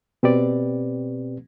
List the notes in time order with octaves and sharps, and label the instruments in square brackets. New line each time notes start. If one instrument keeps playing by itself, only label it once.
[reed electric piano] B2 C4 G4 B4 D5